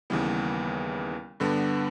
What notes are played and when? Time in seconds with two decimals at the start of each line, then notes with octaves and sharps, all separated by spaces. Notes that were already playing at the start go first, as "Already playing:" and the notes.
0.10 D#2 C#3 E3 G3 B3
1.40 G2 D3 G3 B3 D4